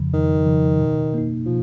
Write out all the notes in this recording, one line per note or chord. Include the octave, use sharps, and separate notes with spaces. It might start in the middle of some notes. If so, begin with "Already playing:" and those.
Already playing: F2 C#3 F3
F2 D#3
C#3 F3
B2
A#3 D#4
B2 F3